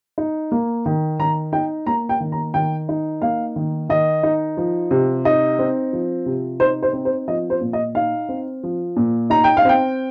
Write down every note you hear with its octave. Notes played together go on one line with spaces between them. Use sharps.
D#4
A#3
D#3
D#3 A#5
D#4 G5
A#3 A#5
G5
D#3
A#5
D#3 G5
D#4
A#3 F5
D#3
D#3 D#5
D#4
F3
C3
D#4 D#5
C4
F3
C3
D#4 C5
C5
C4
C5
F3 D#5
C5
A#2
D#5
D#4 F5
C4
F3
A#2
D#4 A#5
G5
F5
C4 G5